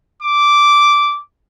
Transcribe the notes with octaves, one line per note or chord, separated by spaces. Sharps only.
D6